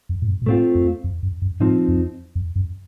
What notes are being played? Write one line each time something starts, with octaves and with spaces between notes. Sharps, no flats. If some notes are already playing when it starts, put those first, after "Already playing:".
F2
A2
F#2
A#2
A2 A3 C4 F4
F2
F2
F#2
F#2
A2 F3 C4 D#4
F2
F2
F#2